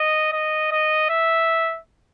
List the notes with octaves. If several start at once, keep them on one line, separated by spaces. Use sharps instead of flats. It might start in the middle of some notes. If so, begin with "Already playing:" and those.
Already playing: D#5
D#5
D#5
E5